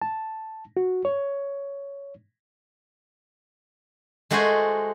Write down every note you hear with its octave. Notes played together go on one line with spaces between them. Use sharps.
A5
F#4
C#5
G#3 A3 F#4 G#4 C5 G#5